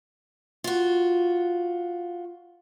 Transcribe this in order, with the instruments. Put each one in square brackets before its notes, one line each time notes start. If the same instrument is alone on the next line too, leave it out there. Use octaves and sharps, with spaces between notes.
[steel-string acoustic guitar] F4 F#4